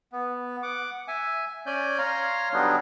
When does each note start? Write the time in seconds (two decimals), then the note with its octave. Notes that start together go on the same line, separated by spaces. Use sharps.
0.12 B3
0.63 F#5 D6
1.08 E5 G#5
1.66 C#4 D5 G#5 G6
1.99 C#5 F5 A#5 C6
2.53 D3 F#3 G3 B3 D4 D#4